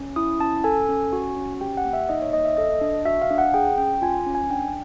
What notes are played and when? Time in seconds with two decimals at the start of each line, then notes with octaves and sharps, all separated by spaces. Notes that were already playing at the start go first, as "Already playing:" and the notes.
Already playing: C#4
0.16 E4 D#6
0.40 C#4 A5
0.64 A4 G#5
0.89 C#4
1.13 F#4
1.36 C#4
1.61 G4 G5
1.77 F#5
1.85 A#3
1.93 E5
2.09 D#4 D#5
2.22 C#5
2.33 A#3 D#5
2.45 E5
2.57 A4 D#5
2.81 D4
3.05 F#4 E5
3.22 F5
3.30 D4
3.38 F#5
3.54 G#4 G5
3.78 C#4 G5
4.02 F4 G#5
4.27 C#4
4.35 G#5
4.50 D4 G5